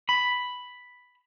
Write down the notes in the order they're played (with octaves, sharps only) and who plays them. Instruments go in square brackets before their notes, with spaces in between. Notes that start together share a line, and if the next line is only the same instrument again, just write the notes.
[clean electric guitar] B5